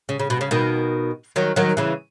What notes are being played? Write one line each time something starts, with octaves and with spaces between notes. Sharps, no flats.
C#3
C#3
B2
C#3
B2 D#3
D#3 F#3
D#3 F#3
C#3 E3